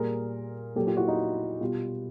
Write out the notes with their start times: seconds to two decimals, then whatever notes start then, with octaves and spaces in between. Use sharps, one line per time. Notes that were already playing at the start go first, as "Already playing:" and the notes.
Already playing: A#2 G3 G#4 A#4
0.76 A#2 F#3 G4 A4
0.87 F4 G4
0.97 E4 F#4
1.07 D#4 F4
1.61 B2 G3 F4 G4